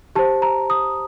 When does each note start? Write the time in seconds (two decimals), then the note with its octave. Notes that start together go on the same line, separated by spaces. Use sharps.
0.15 G4 C5 A5
0.42 A#5
0.70 D#6